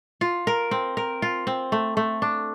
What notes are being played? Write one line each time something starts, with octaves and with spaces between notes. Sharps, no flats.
F4
A#4
C4
A#4
F4
C4
A3
A3
D4